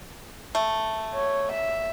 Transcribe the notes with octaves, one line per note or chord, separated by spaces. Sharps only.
A3
C#5
E5